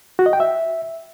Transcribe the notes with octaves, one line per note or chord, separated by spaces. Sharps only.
F#4
D#5
G5
E5